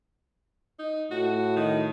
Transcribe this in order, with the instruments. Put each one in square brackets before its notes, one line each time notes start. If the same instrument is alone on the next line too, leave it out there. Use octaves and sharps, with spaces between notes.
[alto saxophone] D#4
[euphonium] A2 [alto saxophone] F#4
[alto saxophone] D#3